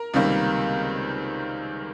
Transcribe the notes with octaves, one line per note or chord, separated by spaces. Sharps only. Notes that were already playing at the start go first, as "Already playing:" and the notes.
Already playing: A#4
C#2 C3 D#3 G3 A#3